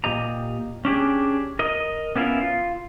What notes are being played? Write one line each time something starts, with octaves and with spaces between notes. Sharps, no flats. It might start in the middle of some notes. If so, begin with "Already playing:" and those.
A#2 G3 G4 D#5 A#5
C#4 D4 G4 G#4
A#4 D#5
B3 C#4 E4 F4 A#4
F4